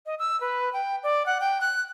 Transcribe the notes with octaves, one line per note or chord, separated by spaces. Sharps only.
D#5
E6
B4
G5
D5
F#5
G5
F#6